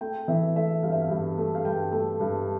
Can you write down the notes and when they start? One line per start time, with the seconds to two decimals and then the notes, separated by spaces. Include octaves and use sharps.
0.01 A3 G5
0.28 E3 E5
0.56 A3 E5
0.83 G2 F5
0.92 E5
1.02 F5
1.10 G2
1.38 A3
1.55 F5
1.65 G2 G5
1.92 A3
2.20 G2